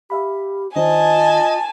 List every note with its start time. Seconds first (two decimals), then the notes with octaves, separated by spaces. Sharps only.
0.10 G4 E5 F5 B5
0.76 D#3 D4 F4 C5 D#5 G#5 A5